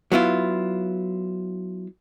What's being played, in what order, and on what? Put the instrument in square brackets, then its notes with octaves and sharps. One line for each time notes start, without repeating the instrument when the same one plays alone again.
[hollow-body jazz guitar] F#3 B3 E4 F4